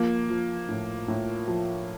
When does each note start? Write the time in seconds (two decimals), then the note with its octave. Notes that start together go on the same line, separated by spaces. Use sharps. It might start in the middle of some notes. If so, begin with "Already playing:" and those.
Already playing: F3 A#3
0.30 F3
0.69 A2
1.08 A2
1.48 F3